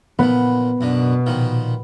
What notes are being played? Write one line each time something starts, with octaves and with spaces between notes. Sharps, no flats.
A#2 F3 B3
F#2 B2 D3
A#2 D#3 F3